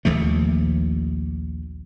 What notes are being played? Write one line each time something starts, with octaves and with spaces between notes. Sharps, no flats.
A#1 D#2 F3 A3